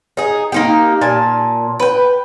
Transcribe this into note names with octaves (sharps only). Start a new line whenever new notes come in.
D#4 G#4
A#3 D#4 G4
A#2 G#5 A5
B4 G5